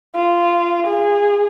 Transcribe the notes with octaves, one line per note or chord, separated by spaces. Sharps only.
F4
G#4